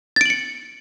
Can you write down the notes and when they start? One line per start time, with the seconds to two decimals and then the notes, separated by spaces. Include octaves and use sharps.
0.16 A6
0.21 D7
0.26 F#7
0.30 C#7